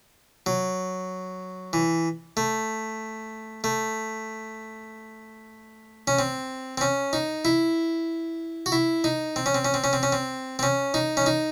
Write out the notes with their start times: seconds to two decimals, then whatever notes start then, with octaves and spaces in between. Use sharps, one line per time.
0.46 F#3
1.73 E3
2.37 A3
3.64 A3
6.07 C#4
6.19 C4
6.77 C4
6.81 C#4
7.13 D#4
7.45 E4
8.66 F#4
8.72 E4
9.04 D#4
9.36 C4
9.46 C#4
9.54 C4
9.65 C#4
9.74 C4
9.84 C#4
9.93 C4
10.03 C#4
10.12 C4
10.59 C4
10.63 C#4
10.94 D#4
11.17 C#4
11.26 D#4